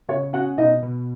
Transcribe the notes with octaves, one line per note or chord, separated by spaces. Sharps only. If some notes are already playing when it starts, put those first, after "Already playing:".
C#3 C#5
C#4 F#4 F#5
B2 D#4 D#5
B2